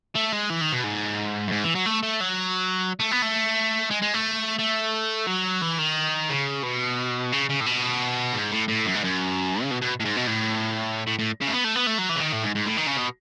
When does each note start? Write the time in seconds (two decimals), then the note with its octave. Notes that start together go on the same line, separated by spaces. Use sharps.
0.15 A3
0.33 G#3
0.50 E3
0.61 D#3
0.72 B2
0.84 G#2
1.48 F#2
1.52 G#2
1.64 E3
1.75 F#3
1.86 A3
2.03 A3
2.21 F#3
3.00 A3
3.11 B3
3.22 A3
3.91 G#3
4.02 G#3
4.14 A3
4.59 A3
5.27 F#3
5.62 E3
5.78 D#3
6.30 C#3
6.63 B2
7.32 C#3
7.49 C#3
7.60 A2
7.66 B2
8.34 G#2
8.52 A2
8.68 A2
8.86 F#2
8.94 G#2
9.04 F#2
9.62 C#3
9.71 B2
9.82 B2
10.00 A2
10.05 G#2
10.17 B2
10.27 A2
11.07 A2
11.19 A2
11.41 C#3
11.47 A3
11.53 B3
11.64 A3
11.76 B3
11.87 A3
11.98 F#3
12.10 E3
12.16 C#3
12.21 D#3
12.32 A2
12.43 G#2
12.55 G#2
12.66 A2
12.78 D#3
12.88 C#3
12.98 B2